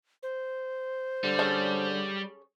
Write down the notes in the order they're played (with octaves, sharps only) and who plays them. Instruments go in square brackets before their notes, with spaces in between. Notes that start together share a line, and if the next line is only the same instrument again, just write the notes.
[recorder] C5
[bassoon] D3 [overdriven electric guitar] G3
[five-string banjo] C#4 G#4 A4